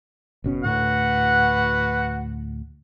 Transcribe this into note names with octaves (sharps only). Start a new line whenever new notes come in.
F#1 B2 C#4
D2 A2 F#4 B4 F#5